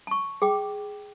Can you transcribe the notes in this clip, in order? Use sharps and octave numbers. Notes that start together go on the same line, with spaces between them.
A5 C#6
G#4 G5 D6